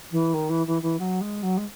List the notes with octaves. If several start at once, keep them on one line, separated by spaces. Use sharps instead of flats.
E3
D#3
E3
E3
E3
F#3
G#3
F#3
G#3